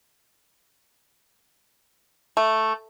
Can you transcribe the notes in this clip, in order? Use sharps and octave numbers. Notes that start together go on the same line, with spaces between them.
A3